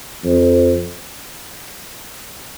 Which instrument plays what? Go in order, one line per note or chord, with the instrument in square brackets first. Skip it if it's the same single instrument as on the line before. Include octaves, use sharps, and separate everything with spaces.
[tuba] F2